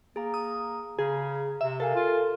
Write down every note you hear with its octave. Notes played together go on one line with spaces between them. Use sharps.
A#3 G#4 A#5
D#6
C#3 G#4 A#5
C3 E5
A4 A#4 F5 G#5
F4